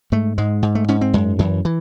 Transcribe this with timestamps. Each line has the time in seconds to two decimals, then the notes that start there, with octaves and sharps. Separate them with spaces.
0.12 G#2 A3
0.38 G#2 G#3
0.63 G#2
0.75 A3
0.88 G#2 C#4
1.01 C4
1.14 F#2 G#3
1.39 F#2 E3
1.65 E3